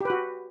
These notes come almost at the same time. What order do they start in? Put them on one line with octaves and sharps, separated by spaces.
G4 B4 F#4